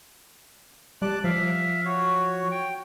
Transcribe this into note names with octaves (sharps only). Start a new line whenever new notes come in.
G3 A5 D6 F#6
F3 E5 F5
F#4 C#5
G5